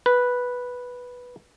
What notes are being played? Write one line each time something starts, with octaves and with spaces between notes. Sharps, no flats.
B4